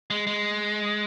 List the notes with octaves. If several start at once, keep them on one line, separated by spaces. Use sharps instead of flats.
G#3
G#3